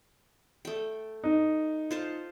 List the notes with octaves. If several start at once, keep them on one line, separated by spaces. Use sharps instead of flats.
A3 G5
D#4
F4 C5 A5